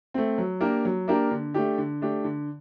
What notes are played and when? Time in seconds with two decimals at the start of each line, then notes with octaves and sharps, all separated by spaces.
0.14 A3 C4
0.38 F#3
0.60 A#3 D4 G4 A#4
0.85 F#3
1.08 A#3 D4 G4 A#4
1.31 D3
1.54 A3 D4 G4
1.78 D3
2.02 A3 D4 G4
2.24 D3